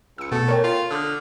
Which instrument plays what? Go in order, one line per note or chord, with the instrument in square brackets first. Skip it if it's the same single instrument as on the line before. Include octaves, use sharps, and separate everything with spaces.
[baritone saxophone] C#2 [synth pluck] E6 C#7
[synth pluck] B2 B3 [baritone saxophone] A3
[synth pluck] A#4 C#5 G5
[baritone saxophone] F4
[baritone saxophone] D3 [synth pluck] D#6 F6